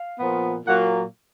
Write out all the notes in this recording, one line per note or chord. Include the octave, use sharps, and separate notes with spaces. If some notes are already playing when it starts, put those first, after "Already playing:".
Already playing: F5
A#2 F3 B3
A#2 F#3 A#3 F#5